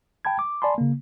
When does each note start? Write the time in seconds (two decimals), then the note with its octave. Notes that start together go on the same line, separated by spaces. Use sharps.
0.25 G5 A5 B5 G#6
0.39 D6
0.62 D5 G#5 A5 B5 C6
0.78 C#3 A#3